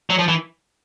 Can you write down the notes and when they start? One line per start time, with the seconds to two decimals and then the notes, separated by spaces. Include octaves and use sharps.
0.10 F#3
0.19 F3
0.28 E3